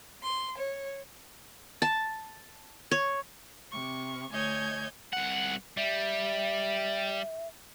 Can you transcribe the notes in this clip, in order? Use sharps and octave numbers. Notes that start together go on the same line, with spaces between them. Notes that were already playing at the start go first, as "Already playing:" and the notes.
C6
C#5
A5
C#5
C3 C#6
D2 C#5 D#5 G#5 G6 G#6
C2 F#5
G3 E5